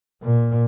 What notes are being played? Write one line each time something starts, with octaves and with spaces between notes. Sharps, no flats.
A#2